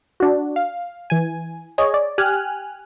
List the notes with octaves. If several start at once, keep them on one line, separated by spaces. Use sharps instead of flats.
D4 F#4
F5
E3 G#5
G#4 C#5 D#5
D5
G4 G#5 F6 F#6